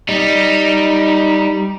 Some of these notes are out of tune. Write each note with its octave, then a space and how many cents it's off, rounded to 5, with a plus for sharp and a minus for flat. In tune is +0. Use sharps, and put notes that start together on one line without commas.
G3 +0 D#4 +5